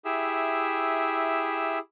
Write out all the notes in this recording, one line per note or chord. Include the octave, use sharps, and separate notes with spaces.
E4 G4 G#4 E5 E6